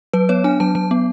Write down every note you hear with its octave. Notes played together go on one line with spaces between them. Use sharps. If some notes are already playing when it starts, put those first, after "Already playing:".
F#3 B4
B3 C#5
D4 G#5
F#3 A5
F#3 A5
B3